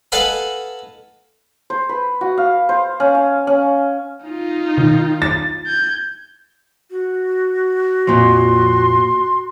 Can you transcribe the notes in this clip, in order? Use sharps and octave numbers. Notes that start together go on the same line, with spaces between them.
A4 B4 D#5 F5 F#5 G#5
C5
B4
F#4
F5
C5
C#4
F5
C#4
D#4 F4
D#3
A6
G6 G#6
F#4
F2 A#2 F3 C6